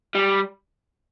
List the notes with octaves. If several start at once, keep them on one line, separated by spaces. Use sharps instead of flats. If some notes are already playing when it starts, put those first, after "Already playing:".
G3